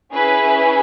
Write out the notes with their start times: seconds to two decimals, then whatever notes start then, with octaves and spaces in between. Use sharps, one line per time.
0.12 C#4 E4 G#4 B4